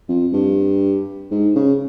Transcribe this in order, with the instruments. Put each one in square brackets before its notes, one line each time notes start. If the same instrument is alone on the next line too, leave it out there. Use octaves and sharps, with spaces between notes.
[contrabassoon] F2
G2
G#2
C#3